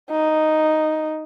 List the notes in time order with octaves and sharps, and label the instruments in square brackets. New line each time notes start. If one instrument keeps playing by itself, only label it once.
[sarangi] D#4